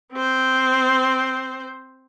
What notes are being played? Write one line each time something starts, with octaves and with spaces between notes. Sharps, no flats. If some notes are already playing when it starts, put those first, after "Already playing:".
C4 C5